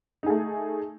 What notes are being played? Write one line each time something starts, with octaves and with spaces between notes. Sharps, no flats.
A3 D#4 G#4